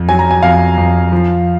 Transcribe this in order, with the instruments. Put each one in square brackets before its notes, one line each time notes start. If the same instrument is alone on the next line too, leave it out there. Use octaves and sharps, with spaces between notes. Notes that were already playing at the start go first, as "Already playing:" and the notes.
Already playing: [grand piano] F2
F#3 G#5
A#5
G#5
F2 F5
F2
F3